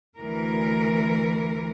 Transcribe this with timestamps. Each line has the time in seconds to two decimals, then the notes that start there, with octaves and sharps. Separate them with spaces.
0.17 D2 E3 A#4